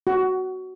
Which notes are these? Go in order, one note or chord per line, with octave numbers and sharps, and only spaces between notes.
F#4